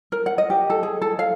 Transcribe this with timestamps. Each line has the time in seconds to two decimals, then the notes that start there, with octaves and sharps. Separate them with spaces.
0.12 A#4
0.26 F#5
0.38 D#5
0.50 G4
0.70 A4
0.83 G#4
1.02 A4
1.19 F5